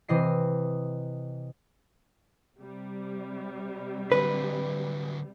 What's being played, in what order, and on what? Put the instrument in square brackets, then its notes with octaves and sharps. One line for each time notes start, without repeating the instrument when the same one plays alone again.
[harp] C3 E3 D#5 C7
[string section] C3 G3
[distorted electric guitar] D3 F#3 [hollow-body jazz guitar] B4